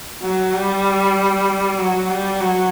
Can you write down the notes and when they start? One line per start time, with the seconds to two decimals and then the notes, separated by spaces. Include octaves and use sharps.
0.23 F#3
0.54 G3
1.78 F#3
2.09 G3
2.40 F#3